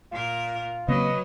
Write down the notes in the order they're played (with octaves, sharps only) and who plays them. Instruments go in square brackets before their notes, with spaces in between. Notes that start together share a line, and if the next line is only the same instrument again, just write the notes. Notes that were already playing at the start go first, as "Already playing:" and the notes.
[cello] A#2 A#4 [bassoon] F4
[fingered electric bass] C#3 A#3 C4 [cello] F#3 [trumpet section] B4 D#5